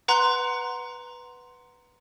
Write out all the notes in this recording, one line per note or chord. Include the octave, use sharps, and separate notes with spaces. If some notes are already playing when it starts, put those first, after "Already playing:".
B4 F#5 A#5 C6 F#6